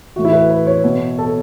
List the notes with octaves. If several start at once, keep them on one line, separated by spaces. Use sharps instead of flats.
A2 E3 F#4
E4
B4
B4
C#5
B2
A4